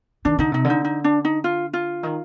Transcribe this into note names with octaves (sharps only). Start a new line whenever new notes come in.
D#3 D4
D3 D#4
C3 D#4
D3
D#4
D#4
D4
D#4
F4
F4
D#3